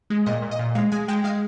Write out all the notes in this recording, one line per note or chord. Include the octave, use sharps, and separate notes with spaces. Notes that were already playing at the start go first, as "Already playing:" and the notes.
G#3
A#2 D#5
A#2
D#5
A#2
G#3 F5
G#3 G#5
G#3 G5
G#3 F5